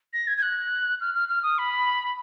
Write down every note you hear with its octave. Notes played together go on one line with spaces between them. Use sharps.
A#6
G#6
G#6
F#6
F6
F6
F6
D#6
B5